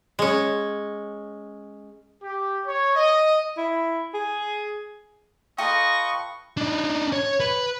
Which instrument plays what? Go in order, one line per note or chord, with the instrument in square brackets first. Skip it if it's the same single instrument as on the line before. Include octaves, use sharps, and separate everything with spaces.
[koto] G#3 C#4
[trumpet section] G4
C#5
D#5
[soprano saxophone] E4
G#4
[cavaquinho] F4 A4 B4 [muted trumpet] D#5 [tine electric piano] G5 D#6 [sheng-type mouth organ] C#6
[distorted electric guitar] D4 D#4
C#5
B4